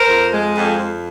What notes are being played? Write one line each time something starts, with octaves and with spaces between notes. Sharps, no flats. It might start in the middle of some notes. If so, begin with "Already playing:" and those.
Already playing: A#4 C5
F2
G#3
F2
F2